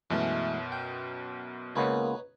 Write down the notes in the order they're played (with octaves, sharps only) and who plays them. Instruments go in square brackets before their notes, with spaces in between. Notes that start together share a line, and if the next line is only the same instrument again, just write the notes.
[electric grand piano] F#2 B2 [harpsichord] E3 G#3 A3
[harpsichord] G5
[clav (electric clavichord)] C#2 C#3 B3 [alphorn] A#3 [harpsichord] D#4 B4 C#5